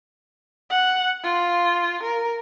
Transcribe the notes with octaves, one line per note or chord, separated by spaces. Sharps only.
F#5
F4
A#4